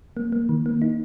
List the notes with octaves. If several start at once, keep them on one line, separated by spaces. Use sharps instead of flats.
A#3
A#3
D#3
A#3
D#4